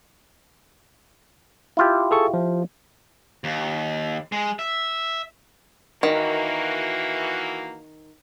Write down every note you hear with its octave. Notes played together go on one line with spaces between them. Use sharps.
E4 F4 G4
G#4 A4 C#6
F3
D#2
G#3
E5
D#3 E3 A#3 F#4